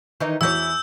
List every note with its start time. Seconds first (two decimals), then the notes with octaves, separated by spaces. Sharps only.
0.20 D#3 E3 D#4
0.41 E2 E3 E4 F#4 C#5 E6 G6